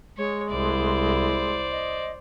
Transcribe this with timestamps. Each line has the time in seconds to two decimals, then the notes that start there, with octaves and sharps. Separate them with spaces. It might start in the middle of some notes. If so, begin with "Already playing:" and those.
0.17 G#3 C#5
0.51 C2 E4 C5 D5
1.71 D#5